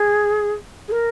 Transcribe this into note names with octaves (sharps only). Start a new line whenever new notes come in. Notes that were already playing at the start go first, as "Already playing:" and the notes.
Already playing: G#4
G#4
A#4